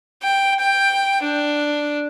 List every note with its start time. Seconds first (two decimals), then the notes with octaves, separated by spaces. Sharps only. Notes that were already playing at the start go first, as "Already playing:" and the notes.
0.23 G5
0.59 G5
1.22 D4